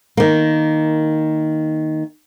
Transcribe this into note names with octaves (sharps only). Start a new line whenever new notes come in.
D#3 A#3